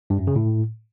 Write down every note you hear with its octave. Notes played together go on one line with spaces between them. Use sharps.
G2
F#2
C#3
A2